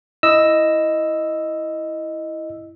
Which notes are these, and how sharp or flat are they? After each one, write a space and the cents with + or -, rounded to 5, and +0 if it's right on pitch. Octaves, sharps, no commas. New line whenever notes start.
E4 +0 D#5 +0 E6 +0